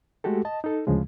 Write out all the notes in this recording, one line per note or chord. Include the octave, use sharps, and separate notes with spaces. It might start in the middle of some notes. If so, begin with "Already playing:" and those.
G#3 A3 F#4 G4 A4
D#5 A5
D#4 A4
D2 C#3 F3 G#3